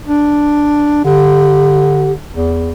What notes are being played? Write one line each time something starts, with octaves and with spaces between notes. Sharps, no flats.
D4
D3 G4
E2